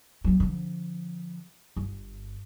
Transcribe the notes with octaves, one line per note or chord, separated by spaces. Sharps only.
F#3 A#3
D3 F3
G1